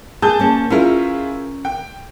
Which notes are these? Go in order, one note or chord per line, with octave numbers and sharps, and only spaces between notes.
G#4 A5 G6
A#3 C#4
C#4 E4 F4 G#4 A#4
G5